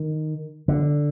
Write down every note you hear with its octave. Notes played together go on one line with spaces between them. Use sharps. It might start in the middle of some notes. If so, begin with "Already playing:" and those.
Already playing: D#3
D3